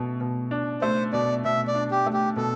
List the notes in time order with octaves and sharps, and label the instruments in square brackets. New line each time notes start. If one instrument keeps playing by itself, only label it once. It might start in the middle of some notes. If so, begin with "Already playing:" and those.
Already playing: [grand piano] B2 A3
B2
D4
[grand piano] A3 [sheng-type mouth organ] C5
[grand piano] B2 [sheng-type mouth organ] D5
[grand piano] B2 [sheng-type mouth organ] E5
[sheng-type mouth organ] D5
[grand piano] D4
[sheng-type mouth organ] G4
[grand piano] A3
[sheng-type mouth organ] G4
[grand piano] B2 [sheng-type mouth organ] A4